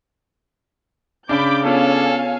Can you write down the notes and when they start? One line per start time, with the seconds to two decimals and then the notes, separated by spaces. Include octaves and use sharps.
1.29 C#3 D4 B5 D6 G6
1.65 B3 C#4 F4 A4 C#5 F5 G#5